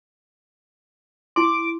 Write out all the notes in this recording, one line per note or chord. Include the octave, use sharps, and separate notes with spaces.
E4 C6 D6